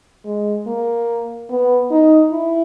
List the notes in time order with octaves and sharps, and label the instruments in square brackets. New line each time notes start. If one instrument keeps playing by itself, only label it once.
[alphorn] G#3
A#3
B3
D#4
E4